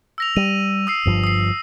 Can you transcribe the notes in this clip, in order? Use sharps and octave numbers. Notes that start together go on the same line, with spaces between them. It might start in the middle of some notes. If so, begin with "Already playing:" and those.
E6 A#6 F7
G3 D#7
D#6 E6 C7
G1 G2 F3
D#6 C7